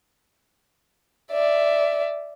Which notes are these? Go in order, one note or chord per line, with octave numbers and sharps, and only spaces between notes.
D5 E5